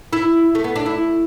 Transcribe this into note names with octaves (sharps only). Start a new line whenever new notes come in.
E4
A3
B3
D4
E4